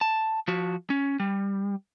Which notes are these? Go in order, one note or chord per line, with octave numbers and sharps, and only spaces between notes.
A5
F3 F#4
C#4
G3